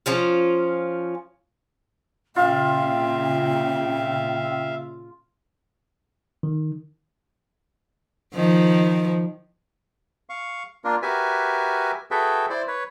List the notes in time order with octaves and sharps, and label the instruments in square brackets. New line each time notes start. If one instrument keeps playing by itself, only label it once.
[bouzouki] F3 C#4 F4
[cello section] A#2 C#3 [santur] F4 [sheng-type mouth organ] E5 F5 [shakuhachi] G5
[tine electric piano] D#3
[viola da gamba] D#3 F3
[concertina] F5 C#6
A#3 D4 F4 A#4
F#4 G4 A#4 B4 E5 G#5
F#4 G#4 A4 B4 E5 G5
E4 C5 D5
B4 C#5